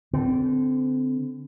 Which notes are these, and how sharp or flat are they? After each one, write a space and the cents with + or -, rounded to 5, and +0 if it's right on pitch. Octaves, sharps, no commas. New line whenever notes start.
D3 -30 C4 -30